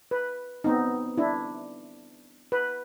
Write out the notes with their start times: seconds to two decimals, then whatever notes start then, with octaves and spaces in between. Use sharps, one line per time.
0.11 B4
0.64 B3 C4 D#4
1.18 D4 E4
2.52 B4